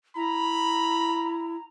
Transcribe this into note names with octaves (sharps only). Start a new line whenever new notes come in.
E4 A#5 B5